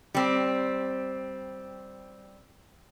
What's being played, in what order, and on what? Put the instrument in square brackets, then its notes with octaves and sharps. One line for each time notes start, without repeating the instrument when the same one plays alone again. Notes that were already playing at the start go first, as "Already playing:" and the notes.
[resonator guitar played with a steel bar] G3 C4